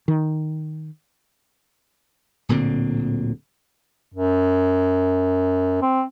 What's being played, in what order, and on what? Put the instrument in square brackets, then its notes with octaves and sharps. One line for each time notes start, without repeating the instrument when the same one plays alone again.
[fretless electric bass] D#3
[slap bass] D1 A#2 D3 C4
[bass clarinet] F#2
C4